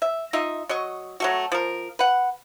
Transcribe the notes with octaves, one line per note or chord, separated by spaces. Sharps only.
E5
D#4 F4 D#5 E5
F#3 D#5 C#6
F#3 A3 F#4
F3 A#4
B4 F#5